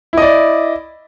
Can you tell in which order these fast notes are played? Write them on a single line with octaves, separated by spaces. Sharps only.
E4 D#5 D5